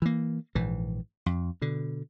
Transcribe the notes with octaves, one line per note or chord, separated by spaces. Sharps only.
E3 A#3
A#1 G#2 E3
F2
B2 D3